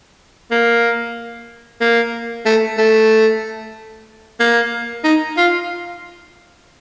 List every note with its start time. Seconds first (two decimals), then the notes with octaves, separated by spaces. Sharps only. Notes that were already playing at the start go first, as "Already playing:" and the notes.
0.51 A#3
1.81 A#3
2.46 A3
2.78 A3
4.40 A#3
5.04 D#4
5.37 F4